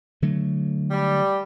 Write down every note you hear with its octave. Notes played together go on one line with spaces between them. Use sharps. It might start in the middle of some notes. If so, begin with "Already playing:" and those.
D3 F#3 A3
G3